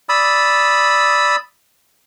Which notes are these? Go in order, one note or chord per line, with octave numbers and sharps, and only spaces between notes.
D5 B5 D#6 E6